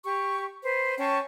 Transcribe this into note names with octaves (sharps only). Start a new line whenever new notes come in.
G4 C#6
B4 C5
C#4 G5 A5 C#6